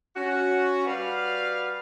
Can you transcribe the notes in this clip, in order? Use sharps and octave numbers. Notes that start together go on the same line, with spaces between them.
C#4 F#4
G3 F#4 B4 D5 F5